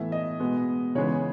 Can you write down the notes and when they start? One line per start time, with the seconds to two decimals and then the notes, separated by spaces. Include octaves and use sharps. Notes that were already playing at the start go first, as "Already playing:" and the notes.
Already playing: A2 E3 B3 E5
0.12 D#5
0.40 B2 G#3 B3
0.95 C#3 E3 G#3 B3 C#5